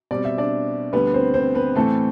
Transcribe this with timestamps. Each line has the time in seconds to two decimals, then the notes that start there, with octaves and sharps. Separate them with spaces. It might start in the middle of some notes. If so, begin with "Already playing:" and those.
0.11 B2 G3 C4 D5
0.25 E5
0.38 D4 D5
0.92 D2 D3 G3 B3 B4
1.14 C4 C5
1.34 C4 C5
1.55 B3 B4
1.75 A2 E3 A3 C4 A4